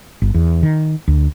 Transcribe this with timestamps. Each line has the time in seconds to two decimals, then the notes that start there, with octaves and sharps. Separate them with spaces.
0.22 G1
0.34 E2
0.63 D#3
1.08 D2